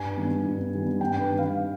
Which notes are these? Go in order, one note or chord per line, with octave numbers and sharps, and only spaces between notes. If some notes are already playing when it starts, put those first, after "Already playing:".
Already playing: G2 G#5
D#3 G3 B3
G2
D#3 G3 B3
G2 G5
B4
D#3 G3 C4
F5